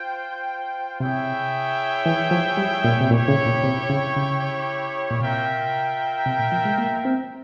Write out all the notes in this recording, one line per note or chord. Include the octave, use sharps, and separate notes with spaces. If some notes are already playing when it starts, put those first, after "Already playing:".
Already playing: F4 C5 G5
C3 E4 G#4 C#5 E5 G5
E3
F3
G3
A#2
C3
A#2 E4 G4 C#5 G5
C#3
A#2
C3
C#3
C#3
A#2
C3 F4 A#4 E5 G5
C3
A#2
F3
G#3
A#3
C4